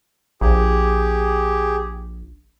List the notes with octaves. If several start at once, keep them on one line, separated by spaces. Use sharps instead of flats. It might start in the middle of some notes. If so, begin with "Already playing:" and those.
A#1 G4 G#4